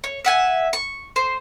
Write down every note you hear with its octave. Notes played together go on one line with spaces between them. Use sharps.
C#5
E5 F#5 G#5
C#6
C5